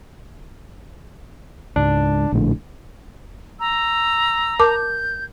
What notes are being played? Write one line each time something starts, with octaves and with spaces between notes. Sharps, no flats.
C#2 G#2 D4
A#1 A2 D3
A#5 E6
A#4 A5 D6 G6